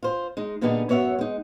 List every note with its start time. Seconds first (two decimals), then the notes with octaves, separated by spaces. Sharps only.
0.03 F4 C5
0.37 G#3 D#4
0.61 A#2 D3 G3 B3 D#4 G#4
0.89 F#2 B3 C#5 E5 F#5
1.18 G#3 D#4